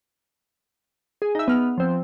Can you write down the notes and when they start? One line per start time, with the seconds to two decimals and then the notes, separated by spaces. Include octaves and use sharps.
1.22 G#4
1.35 D#4 E5
1.48 B3 F6
1.78 F3 C4